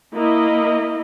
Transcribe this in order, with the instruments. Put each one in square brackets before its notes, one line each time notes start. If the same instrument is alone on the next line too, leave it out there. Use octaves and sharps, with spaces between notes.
[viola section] A#3 E4 D#5